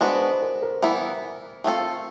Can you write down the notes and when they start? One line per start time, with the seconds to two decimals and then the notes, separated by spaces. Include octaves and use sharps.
0.01 G#3 B3 D4 F#4 B4 C5
0.21 C5
0.42 A#4
0.62 A#4
0.82 E3 G3 B3 E4
1.64 A3 C4 F4 A4